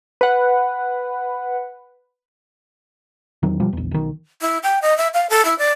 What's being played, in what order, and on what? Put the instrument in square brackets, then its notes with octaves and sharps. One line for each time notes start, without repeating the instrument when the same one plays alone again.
[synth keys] B4 F#5
[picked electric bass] E2 D#3 F#3
B2 F3 G3
A#1 E2
B1 D#3
[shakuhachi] E4
G5
D#5
E5
F5
A4
E4
D5